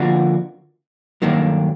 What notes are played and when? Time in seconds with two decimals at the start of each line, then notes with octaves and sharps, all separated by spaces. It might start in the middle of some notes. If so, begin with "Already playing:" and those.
Already playing: D3 F3 A#3 D4 F#4
1.22 G2 D#3 F#3 A#3 D4